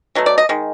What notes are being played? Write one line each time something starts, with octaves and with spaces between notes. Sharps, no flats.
B2 F#3 A3
D5
D#5
D#3 G#3